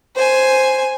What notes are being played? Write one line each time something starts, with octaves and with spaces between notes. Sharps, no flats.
C5 G#5